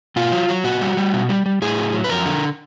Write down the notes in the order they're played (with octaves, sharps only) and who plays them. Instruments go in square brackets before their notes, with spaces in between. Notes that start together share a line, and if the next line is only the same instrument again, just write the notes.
[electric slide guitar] B2 F4
F#3
F#3
A#2 F#4
G3
G3
B2
G3
G3
A2 G#4
F#3
F#3
B4
F2 A#4
D3